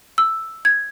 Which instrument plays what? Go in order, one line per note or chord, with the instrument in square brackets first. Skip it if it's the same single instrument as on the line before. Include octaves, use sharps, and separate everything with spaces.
[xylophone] E6
G#6